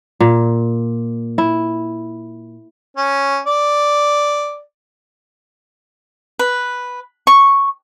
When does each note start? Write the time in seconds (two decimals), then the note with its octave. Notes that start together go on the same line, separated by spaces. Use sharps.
0.20 A#2
1.38 E4
2.97 C#4
3.46 D5
6.39 B4
7.27 C#6